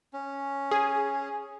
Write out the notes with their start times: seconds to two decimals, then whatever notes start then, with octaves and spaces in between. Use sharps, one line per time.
0.13 C#4
0.71 G#4